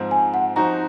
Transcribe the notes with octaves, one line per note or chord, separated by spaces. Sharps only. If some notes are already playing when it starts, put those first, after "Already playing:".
Already playing: G#2 F3 C4
G#5
F#5
F3 C4 D#4 F#4 A#5